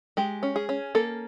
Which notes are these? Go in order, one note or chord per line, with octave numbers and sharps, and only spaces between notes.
G#3 G4
C#4
G#4
C#4
A#3 A4